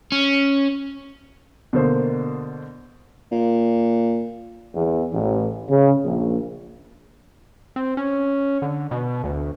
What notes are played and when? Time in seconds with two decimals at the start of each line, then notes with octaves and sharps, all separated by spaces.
0.12 C#4
1.73 B2 D3 A#3 C5
3.31 A#2
4.75 E2
5.13 A1
5.69 C#3
6.04 A#1
7.76 C4
7.97 C#4
8.62 D3
8.91 B2
9.24 D2